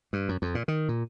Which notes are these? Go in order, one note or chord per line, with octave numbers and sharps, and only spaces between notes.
G2
F#2
F2
A#2
D#3
A#2